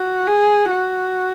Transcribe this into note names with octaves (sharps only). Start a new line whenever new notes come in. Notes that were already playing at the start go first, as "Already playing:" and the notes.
Already playing: F#4
G#4
F#4